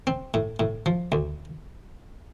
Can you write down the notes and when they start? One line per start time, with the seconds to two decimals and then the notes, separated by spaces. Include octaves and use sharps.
0.07 C4
0.34 A2
0.60 A2
0.86 F3
1.12 D2